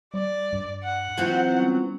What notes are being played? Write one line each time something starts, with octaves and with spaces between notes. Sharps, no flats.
G3 D5
G2
F#5
E3 F#3 C4 F4
G3 B3 C#4